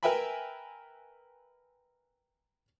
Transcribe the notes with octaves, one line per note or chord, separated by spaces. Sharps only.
A#4 B4 E5 G5 G#5 B5